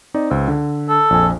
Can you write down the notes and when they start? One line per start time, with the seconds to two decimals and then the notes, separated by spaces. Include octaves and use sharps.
0.14 C4 D#4 D5
0.30 C#2 C5 E6
0.48 D3
0.89 A4
1.10 A#1 F2 G#5